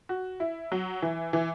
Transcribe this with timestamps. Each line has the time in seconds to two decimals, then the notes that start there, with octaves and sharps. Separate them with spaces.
0.09 F#4
0.40 E4
0.72 F#3
1.02 E3
1.33 E3